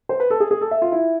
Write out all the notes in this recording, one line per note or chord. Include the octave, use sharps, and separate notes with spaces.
C5
B4
A4
G#4
G#4
A4
E5
F4
E4